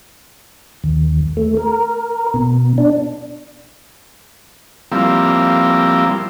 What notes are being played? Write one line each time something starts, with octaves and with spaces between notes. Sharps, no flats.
D#2
A3
A#4
B2
D4
F3 G3 A#3 C4 E4